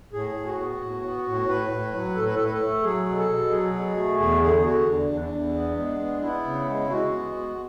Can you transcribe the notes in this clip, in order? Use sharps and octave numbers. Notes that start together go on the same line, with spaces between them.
A2 G#4
A2
F#4
B3
A2
B3
A2
A2 B4
A2
F#3
A2 A4
B4
A2 A4
B4
A4
A3
F#3 G#4
B2
A4
B2
F#3 G#4
B2
A3
E2 G#4
D3 G#4
D3 F#4
E2 D4
E2
D4
E2
B3
G#3
B3
B3 E4
C#3
G#3
G#3 F#4
B3
G#3